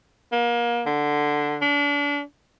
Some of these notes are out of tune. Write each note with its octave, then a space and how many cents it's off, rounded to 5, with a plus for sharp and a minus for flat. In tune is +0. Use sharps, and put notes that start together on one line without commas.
A#3 +30
D3 +5
D4 -35